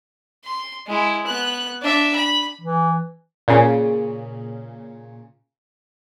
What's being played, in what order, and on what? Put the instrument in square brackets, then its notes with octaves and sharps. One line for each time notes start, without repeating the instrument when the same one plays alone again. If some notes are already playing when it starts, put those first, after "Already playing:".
[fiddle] C6
G#3 E4
B3 F#6
D4 E5
B5
[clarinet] E3
[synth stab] A#2 C#3